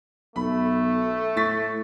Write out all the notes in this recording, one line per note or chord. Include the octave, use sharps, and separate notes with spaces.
B1 A3 B5
A2 C#6 A6 B6